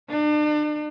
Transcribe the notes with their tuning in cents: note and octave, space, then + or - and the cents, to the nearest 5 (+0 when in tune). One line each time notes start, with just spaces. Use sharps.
D4 +40